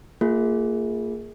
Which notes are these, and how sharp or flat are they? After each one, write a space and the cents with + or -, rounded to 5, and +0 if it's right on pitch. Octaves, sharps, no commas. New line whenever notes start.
A#3 -25 F4 +0 G#4 +0